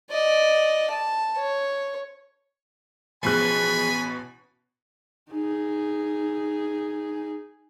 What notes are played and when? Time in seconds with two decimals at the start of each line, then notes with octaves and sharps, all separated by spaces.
0.10 D5 D#5
0.90 A5
1.37 C#5
3.23 A1 B2 F3 G#4 G#5 B5 F#6
5.31 D#4 G#4